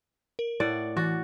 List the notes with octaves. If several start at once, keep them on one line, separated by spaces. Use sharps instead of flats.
A#4
A2 D5 F#5
E3 F#4 A6